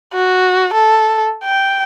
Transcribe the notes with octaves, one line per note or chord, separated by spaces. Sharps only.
F#4
A4
G5